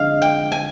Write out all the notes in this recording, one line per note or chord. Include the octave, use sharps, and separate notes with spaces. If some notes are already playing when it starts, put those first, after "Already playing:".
Already playing: F2 D3 G#3 D#5 F5
G5
G#5